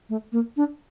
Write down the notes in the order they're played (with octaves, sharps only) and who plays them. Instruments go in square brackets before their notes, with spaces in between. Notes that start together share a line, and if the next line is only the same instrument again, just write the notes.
[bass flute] A3
A#3
D4